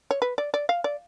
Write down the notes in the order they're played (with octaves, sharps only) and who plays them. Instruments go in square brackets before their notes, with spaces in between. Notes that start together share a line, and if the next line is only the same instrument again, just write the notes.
[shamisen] C#5
B4
D5
D5
F5
D5